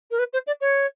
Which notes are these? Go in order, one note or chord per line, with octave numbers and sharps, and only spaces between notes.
A#4
B4
C5
D5
C#5